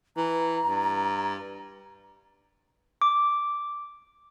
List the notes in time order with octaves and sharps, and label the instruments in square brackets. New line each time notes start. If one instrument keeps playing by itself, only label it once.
[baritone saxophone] E3 [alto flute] A#5
[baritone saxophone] G2
[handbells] D6